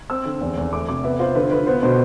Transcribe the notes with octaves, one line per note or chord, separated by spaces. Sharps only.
C4 E6
D3
E2
E2
A3 D6
C3 D6
B3 E5
F4 C5
D3 B4
D3 B4
B3 C5
B2 C5